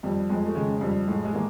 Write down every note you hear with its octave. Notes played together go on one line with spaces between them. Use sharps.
F2 G3
F2 G#3
A3
C#3 G#3
F2 G3
A2 G#3
G#3
E3 A#3